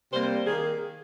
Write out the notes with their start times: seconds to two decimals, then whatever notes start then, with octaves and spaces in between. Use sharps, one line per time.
0.12 C3 G3 A#3 C5
0.46 D#3 A#3 G#4